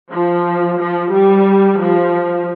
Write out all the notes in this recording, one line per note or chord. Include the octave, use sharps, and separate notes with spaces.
F3
F3
G3
F3